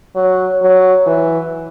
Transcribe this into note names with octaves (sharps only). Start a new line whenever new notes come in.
F#3
F#3
E3